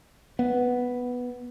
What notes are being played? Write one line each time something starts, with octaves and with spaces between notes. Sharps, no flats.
B3